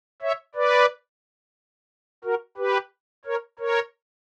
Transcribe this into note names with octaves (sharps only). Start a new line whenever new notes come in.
C#5 E5
B4 D5
F#4 A#4
G4 B4
A#4 C#5
A#4 C#5